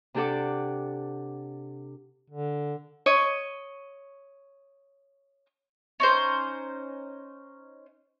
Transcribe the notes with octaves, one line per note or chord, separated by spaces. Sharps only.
C3 D4 G4 A4 F#5 D6
D3
C#5 D#5 C#6
C#4 D#4 C5